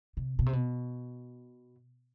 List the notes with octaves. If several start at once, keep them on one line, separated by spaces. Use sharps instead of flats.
C3
B2
C3
B2